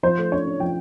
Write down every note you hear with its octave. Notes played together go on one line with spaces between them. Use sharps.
F3 C5
A3
D4 C#5
D4
F3 G5